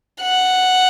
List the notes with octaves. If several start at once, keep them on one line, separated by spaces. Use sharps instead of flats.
F#5